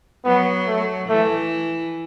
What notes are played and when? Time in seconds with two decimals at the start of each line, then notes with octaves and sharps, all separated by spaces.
0.25 F#3 B3
0.67 A3
1.09 E3 A3